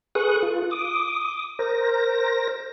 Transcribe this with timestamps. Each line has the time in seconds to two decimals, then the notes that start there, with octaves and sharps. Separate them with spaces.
0.15 G#4 A4 B4 C#6 D#6 F#6
0.43 F4
0.71 D6 D#6
1.59 A#4 C5 A#6